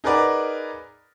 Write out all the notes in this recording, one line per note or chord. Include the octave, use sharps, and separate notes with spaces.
D#4 G#4 A#4 B4 D5 F#5